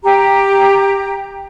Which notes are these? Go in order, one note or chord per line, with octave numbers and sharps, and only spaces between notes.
G4 A#5